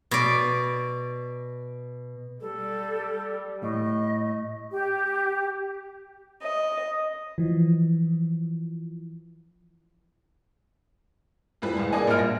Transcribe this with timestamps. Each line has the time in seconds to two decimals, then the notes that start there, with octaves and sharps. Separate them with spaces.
0.11 B2 D5
2.41 G3 A4
3.63 A2 D#5
4.72 G4
6.44 D#5
7.38 E3 F3
11.62 F2 E3 G3 B4
11.77 C2 G#3
11.92 A#3 D4 G#4 D5 D#5 G#5
12.07 A#1 G2 A#3 F4 F6 D7
12.19 A#6